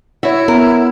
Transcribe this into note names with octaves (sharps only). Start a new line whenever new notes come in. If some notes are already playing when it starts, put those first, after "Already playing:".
E4 F#4 C#5 E5
B3 A#4